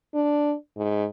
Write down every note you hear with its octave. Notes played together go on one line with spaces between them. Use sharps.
D4
G#2